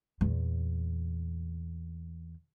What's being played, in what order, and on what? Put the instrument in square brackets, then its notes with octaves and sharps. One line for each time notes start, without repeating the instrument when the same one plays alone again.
[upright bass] E2 A#2